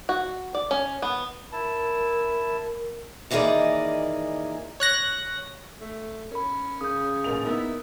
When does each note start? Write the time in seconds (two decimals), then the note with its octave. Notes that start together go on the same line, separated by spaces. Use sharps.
0.09 F#4
0.55 D5
0.71 C#4
1.02 B3
1.52 E4 A#4 A5
3.31 D#2 E3 A#3 D#4 G#4 D5
4.80 C#5 F#6 A#6
5.81 A3
6.32 C#4 A#4 B5
6.81 C#3 D#6 G6
7.24 A1 A#3 F7
7.45 A#3 B3 D#4 E4